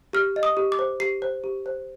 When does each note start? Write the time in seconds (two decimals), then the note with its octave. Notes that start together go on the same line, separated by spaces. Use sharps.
0.13 G4 F6
0.36 D#5
0.43 D#6
0.57 G4
0.72 D6
0.79 C5
1.00 G4 C7
1.22 C5
1.44 G4
1.66 C5